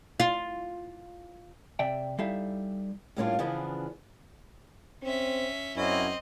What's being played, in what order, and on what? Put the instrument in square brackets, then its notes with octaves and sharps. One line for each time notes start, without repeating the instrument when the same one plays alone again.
[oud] F4
[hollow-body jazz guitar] C3 D5 E5 G5
G3 D#4 E4 A4 E5 F5
[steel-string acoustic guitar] A2 G3 A#3 C#4 D4 F4
C#3 E3 F3 B3 D4
[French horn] C4 [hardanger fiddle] C#4 E5
[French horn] F#2 [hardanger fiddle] C4 D#5 [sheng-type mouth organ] C#4 E4